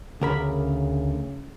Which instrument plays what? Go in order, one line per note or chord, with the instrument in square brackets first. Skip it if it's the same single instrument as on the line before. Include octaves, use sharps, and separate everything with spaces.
[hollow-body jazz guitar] D2 A#4 B5 [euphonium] C#3